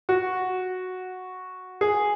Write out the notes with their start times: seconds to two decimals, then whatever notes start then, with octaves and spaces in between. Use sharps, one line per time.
0.09 F#4
1.81 G#4